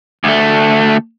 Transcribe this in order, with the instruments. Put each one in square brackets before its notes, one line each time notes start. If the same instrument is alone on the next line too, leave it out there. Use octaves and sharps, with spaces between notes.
[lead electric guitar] D2 A3